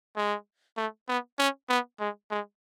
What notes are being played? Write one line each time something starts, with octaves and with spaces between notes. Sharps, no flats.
G#3
A3
B3
C#4
B3
G#3
G#3